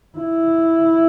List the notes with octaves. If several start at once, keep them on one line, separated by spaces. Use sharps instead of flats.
E4